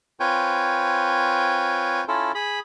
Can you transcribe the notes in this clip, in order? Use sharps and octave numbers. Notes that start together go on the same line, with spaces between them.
C4 F4 B4 C#5 G5 G#5
C#4 E4 F4 A4
G#4 B5